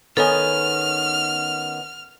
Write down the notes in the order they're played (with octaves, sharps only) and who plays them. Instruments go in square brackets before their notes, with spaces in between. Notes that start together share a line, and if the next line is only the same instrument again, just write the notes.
[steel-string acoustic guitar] D#3 B3 C#4 [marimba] A4 G#5 [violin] F6